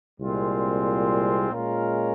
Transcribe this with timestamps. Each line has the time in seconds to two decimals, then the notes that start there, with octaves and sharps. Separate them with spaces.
0.19 C2 A#2 G#3 C4 F4
1.50 A#2 G#3 C#4 F4 A#4